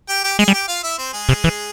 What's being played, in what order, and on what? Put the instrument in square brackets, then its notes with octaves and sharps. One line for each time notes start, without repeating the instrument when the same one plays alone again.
[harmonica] G4 G5
G4 G5
[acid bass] G#3 [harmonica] G#4 G#5
[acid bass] G3
[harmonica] G4 G5
F4 F5
E4 E5
C4 C5
G#3 G#4
[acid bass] C3
E3